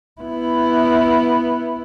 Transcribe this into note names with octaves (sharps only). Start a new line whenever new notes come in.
B3 E4